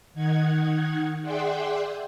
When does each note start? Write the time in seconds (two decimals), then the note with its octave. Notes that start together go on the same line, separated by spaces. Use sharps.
0.14 D#3 D#4 F#5 G#6
1.22 G#4 D5 E5 F#5 G5 C6